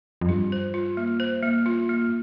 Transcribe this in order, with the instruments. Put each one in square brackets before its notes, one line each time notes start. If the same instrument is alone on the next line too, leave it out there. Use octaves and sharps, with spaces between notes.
[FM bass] F2
[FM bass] G2 [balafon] F4
[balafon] C5
F4
A#3
C5
A#3
F4
A#3